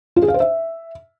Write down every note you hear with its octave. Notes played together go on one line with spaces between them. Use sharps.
F4
G#4
F5
C5
E5